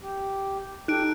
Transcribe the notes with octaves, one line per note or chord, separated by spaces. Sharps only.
G4
D#4 G4 A4 F#6 D7